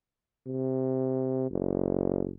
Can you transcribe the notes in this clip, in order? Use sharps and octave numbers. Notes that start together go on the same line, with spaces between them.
C3
F#1